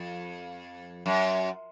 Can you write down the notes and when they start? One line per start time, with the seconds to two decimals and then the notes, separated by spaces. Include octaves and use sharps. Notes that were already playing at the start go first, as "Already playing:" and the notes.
Already playing: F2
1.06 F#2